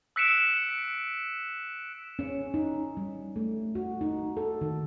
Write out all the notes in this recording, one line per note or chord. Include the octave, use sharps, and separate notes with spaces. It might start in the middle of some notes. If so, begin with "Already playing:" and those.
E6 F#6 B6 C#7 D7 E7
C#4
D#4
G3
A3
F#4
D#4
A4
D#3